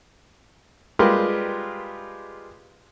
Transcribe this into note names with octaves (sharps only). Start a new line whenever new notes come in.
G3 G#3 F4 G4 A#4 B4